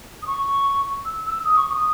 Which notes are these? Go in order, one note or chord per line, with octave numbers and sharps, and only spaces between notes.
D#6
C#6
E6
E6
D#6
C#6
D#6